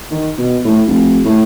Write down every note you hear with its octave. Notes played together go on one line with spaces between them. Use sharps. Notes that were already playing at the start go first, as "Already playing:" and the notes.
D#3
B2
A2
F1
A2